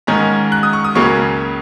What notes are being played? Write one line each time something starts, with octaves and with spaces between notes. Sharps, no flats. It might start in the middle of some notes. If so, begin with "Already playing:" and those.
G#2 D#3 G#3 C#4 A#5
F#6
D#6
C#6
D#6
C#2 C#3 F#3 A#3 C#4 C#6